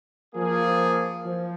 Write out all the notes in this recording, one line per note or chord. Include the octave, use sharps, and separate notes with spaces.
F3 A#3 G#4
F3